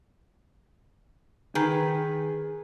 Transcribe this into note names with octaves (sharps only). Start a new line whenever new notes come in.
D#3 G#4 B4